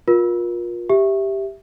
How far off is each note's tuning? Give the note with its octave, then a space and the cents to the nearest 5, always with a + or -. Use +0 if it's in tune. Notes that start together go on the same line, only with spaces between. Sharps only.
F4 +25 A#4 +35
G4 +0 E5 +0